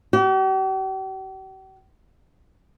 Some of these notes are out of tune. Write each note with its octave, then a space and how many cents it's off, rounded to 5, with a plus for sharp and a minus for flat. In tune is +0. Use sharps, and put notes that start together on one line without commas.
G4 -45